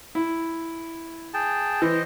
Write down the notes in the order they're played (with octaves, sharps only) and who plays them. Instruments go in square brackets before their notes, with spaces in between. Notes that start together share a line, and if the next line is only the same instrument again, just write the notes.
[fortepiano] E4
[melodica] G#4 G5 A5
[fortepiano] E3 [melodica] C5 D#5